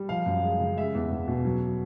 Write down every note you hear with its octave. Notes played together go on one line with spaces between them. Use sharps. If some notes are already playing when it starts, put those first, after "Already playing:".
Already playing: G3
F3 F5
F#2
G#3
C#3
G#3 E5
E2
E2
B2
F#3